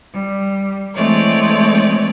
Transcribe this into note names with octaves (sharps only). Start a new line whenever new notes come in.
G3
E3 G#3 A3 C4 C#5 D5